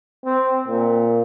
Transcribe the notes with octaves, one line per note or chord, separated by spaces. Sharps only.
C4
A#2